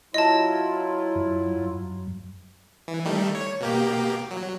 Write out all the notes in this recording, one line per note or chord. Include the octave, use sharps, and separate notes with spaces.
F#3 E4 F4 D#5 A5
F#2
E3
D#3 G3 A3
C#5
B2 A#3 G4
F#3